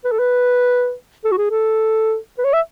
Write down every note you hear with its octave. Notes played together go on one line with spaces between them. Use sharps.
B4
A4
B4
A4
F#4
G#4
A4
B4
C#5
E5